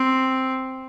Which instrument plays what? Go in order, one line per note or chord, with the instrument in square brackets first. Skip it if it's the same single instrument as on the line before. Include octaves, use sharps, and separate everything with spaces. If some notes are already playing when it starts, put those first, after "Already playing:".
Already playing: [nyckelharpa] C4